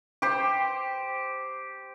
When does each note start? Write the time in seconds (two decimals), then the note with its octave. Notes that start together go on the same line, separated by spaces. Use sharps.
0.22 G4 C5